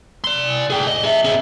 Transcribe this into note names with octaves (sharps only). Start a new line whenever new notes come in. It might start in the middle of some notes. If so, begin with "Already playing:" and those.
D5 C6
G#4 G5
D#5
G#4 E5
C4 G#4